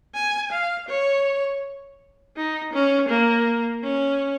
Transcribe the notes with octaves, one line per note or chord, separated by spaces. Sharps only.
G#5
F5
C#5
D#4
C#4
A#3
C#4